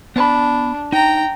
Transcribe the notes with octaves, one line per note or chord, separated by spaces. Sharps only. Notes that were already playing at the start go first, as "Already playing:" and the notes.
B3 D4 A5 B5
D#4 G5 A#5